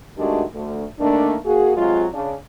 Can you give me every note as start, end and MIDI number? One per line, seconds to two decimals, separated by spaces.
0.18 0.43 51
0.18 0.43 56
0.18 0.43 57
0.18 0.43 62
0.18 0.43 66
0.18 0.43 67
0.54 0.83 38
1.00 1.36 51
1.00 1.36 57
1.00 1.36 58
1.00 1.36 62
1.45 1.76 58
1.45 1.76 66
1.45 1.76 68
1.77 2.06 48
1.77 2.06 54
1.77 2.06 56
1.77 2.06 65
2.13 2.33 49
2.13 2.33 62